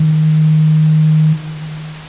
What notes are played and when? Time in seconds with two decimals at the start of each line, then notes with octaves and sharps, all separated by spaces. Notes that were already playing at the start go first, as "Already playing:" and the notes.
Already playing: D#3